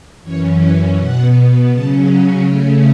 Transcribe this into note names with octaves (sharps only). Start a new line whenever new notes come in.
F#2 E3 C#4 C#5
B4
B2 B3 F#5
C#3 F#3 C#4 A5
C#3 A3 C#4